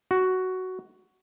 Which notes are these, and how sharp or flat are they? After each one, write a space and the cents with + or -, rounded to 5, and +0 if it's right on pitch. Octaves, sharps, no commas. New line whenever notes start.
F#4 +10